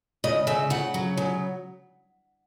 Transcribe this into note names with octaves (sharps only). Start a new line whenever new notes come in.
C#3 D#5
C#3 E5
C#3 F#5
F#3
C#3